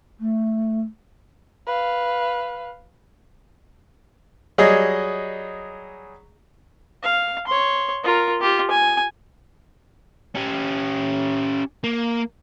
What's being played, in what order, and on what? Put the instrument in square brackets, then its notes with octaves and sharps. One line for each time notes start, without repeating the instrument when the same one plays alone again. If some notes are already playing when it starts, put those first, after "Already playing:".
[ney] A3
[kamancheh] B4 F5
[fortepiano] F#3 G3 G#4 D#5
[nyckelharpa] F5
C#5 C6
F4 A#4
F4 G4
G#5
[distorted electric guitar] C#4 G4
A#3